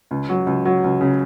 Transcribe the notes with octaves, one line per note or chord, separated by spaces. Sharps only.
C#2
F#3
C#2
F#3
C#2
C#3